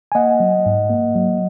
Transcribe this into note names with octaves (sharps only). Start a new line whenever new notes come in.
G#5
A#3 D#5 F#5
F#3
G#2
A#3
F#3